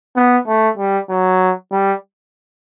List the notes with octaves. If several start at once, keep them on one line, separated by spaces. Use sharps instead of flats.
B3
A3
G3
F#3
G3